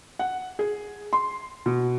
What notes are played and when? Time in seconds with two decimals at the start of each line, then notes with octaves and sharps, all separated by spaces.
0.19 F#5
0.59 G#4
1.13 C6
1.66 B2